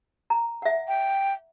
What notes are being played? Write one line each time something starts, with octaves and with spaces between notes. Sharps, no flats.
A#5
E5 F#5
G5